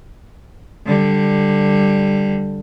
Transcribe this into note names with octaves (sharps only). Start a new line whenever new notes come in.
D3 G3